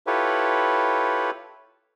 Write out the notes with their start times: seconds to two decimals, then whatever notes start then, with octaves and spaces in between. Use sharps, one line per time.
0.07 E4 F4 G4 A4 B4 C#5